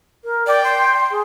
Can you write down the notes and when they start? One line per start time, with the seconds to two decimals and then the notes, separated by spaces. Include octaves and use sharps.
0.24 A#4
0.47 D5 G5
0.64 C6
1.11 G#4